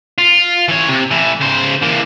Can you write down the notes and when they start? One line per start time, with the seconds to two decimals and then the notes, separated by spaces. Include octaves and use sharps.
0.18 F4
0.68 E3 C#5
0.89 C3
1.11 E3 A3
1.41 C#3 C5
1.82 E3 A#3